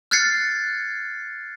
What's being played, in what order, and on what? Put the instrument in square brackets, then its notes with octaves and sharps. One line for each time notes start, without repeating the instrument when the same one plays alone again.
[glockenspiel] F6 F#6 G#6 A6 C7 C#7